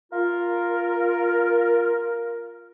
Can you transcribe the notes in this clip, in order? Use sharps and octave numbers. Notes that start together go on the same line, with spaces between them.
F4 A#4